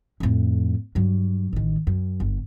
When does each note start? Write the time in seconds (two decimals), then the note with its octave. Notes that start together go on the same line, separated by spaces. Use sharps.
0.20 F2 A2
0.95 G2 F#3
1.53 A1 D#3
1.87 F#2
2.20 G1